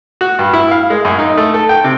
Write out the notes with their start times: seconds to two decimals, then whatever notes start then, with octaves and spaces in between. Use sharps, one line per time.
0.21 F#4
0.39 G2
0.53 E4
0.71 F5
0.90 G#3
1.05 F#2
1.19 D#4
1.37 A3
1.54 A4
1.69 G5
1.84 C3